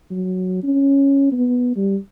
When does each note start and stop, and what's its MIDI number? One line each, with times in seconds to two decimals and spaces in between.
0.11 0.62 54
0.63 1.30 61
1.32 1.72 59
1.76 1.97 55